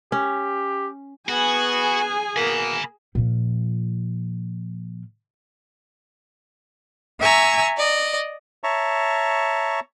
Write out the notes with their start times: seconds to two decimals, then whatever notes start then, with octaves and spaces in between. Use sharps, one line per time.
0.12 C#4 G4
1.29 B3 F#4 G#4 G#5
2.36 B2 A#3 G#5 B5
3.15 A#2 F3
7.20 E5 G#5 A#5 C#6 E6
7.78 D5 D#5
8.64 C#5 E5 A5 A#5 C#6